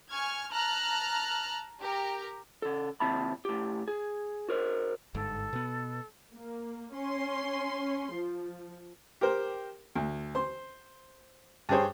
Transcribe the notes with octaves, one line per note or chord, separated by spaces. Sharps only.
G#5 C#6 F6 G#6
A5 A#5 F6 F#6
G4 A#4 A#5
C#3 A4
D#2 C3 E4 A5 B5
A2 G4
G#4
F#4 A#4 C5
G1 G#2 A4
B2 B3
A#3
C#4 C6
F3
G4 A#4 C5
D2
C5 C6
G2 G3 G#4 C5 C#5